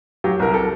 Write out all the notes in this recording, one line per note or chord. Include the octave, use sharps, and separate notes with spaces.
F#3 G4
C2 A#4
A4